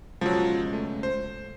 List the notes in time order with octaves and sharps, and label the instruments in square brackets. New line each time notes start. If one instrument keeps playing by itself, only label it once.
[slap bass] C#2 B2 [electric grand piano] F3 F#3
[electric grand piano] A3
C5